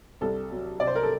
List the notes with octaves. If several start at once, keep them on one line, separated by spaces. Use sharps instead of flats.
C2 A4
F#3
C3 D5
C5
A#4
A4